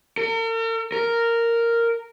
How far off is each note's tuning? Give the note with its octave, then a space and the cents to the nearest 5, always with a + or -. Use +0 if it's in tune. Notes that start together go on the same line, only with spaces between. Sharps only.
A#4 -45
A#4 -5